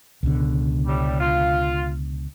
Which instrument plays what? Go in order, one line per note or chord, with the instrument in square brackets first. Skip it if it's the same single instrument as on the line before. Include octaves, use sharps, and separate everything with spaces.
[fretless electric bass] C#2 B2 D3
[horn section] A2 G3
F4